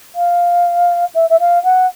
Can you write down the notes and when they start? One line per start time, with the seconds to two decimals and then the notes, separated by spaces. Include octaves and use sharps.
0.15 F5
1.14 E5
1.29 E5
1.39 F5
1.64 F#5